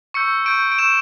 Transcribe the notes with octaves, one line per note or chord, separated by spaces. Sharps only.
C#6 E6 G6 C#7
C#6 E6 G6 D7
D7
C#6 E6 G6 E7